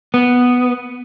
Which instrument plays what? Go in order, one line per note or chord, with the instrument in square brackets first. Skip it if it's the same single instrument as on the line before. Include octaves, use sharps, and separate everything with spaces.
[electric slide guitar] B3